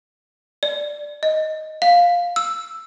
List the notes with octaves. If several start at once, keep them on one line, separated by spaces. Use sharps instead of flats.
D5
D#5
F5
E6